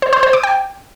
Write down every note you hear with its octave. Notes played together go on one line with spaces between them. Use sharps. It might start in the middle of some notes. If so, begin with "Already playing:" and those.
C5
C5
C5
D6
G5